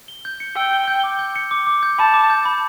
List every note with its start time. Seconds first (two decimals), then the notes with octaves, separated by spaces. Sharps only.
0.08 G7
0.25 G6
0.40 C#7
0.56 G5 E6
0.72 G7
0.88 G6
1.04 D6
1.19 G6
1.36 C#7
1.51 D6
1.67 D6
1.83 G6
1.98 A5 B5
2.14 D6
2.30 G6
2.45 B5